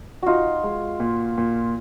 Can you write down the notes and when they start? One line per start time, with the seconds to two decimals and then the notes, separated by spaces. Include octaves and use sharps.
0.23 D#4 F4 F#4
0.64 G#3
1.00 A#2
1.38 A#2